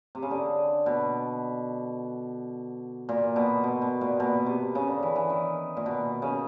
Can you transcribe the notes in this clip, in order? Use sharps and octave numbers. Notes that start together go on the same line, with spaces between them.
C3
C#3
D3
B2
A#2
B2
B2
B2
A#2
B2
C3
C#3
D3
E3
E3
D#3
A#2
B2
C#3